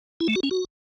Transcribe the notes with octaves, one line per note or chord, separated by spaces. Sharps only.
E4
A3
F#4
C#4
F#4